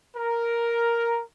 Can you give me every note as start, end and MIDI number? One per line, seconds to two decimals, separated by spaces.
0.17 1.20 70